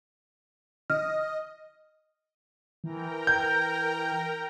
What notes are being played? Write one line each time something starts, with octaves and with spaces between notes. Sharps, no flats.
D#5 F6
E3 A#4 G5 A#5
G6